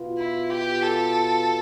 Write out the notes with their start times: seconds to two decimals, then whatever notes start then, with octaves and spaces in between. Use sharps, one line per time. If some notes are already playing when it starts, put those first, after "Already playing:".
Already playing: B2 B3 F4
0.18 E4
0.50 G4
0.82 A4